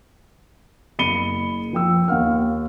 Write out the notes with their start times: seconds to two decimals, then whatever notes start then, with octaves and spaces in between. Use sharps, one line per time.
0.99 F#1 B5 C#7 D#7 G7
1.73 F3 G5 E6
2.08 D#2 F5 F#5 F6